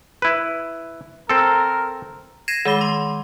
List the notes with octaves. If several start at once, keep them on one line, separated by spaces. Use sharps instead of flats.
E4 B4
C4 A4 A#4
G#6 A#6 C7 D#7 E7
D#3 G#3 D6 G7
C6